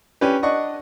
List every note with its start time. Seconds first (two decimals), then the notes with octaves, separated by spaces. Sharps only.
0.21 C#4 D4 G4 B4
0.43 D4 D#5 F#5 C#6